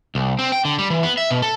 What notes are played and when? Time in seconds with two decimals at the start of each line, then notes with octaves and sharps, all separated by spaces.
0.15 C2
0.39 C4
0.52 G5
0.65 D3
0.78 G3
0.90 E3
1.03 B3
1.17 E5
1.31 B2
1.42 A4